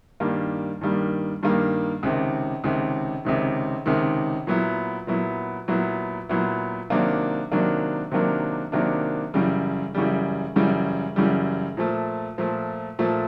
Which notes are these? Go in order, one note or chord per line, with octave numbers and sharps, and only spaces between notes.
G2 D#3 G3 A#3
G2 D#3 G3 A#3
G2 D#3 G3 A#3
C#2 C3 D#3
C#2 C3 D#3
C#2 C3 D#3
C#2 C3 D#3
A#2 F#3 B3 E4
A#2 F#3 B3 E4
A#2 F#3 B3 E4
A#2 F#3 B3 E4
C3 D#3 F#3 A#3 D4
C3 D#3 F#3 A#3 D4
C3 D#3 F#3 A#3 D4
C3 D#3 F#3 A#3 D4
F#2 C#3 E3 G3
F#2 C#3 E3 G3
F#2 C#3 E3 G3
F#2 C#3 E3 G3
A#2 F3 A3
A#2 F3 A3
A#2 F3 A3